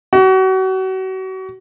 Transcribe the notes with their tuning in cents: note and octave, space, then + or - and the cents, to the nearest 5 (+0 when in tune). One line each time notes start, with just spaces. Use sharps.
F#4 +35